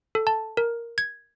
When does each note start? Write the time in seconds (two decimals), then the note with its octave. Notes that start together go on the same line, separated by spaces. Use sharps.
0.15 A4
0.27 A5
0.57 A#4
0.98 G#6